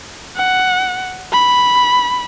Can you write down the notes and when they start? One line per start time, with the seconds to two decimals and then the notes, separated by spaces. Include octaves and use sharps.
0.36 F#5
1.33 B5